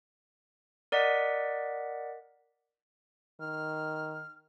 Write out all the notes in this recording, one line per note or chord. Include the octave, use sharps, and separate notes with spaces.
A#4 D5 D#5 F#5 B6
D#3 F6